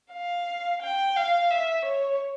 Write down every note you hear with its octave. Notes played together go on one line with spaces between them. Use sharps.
F5
G5
F5
E5
C#5